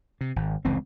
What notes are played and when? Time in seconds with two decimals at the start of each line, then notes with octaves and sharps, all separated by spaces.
0.21 C3
0.36 G#1
0.65 F1 C#2 E3 C4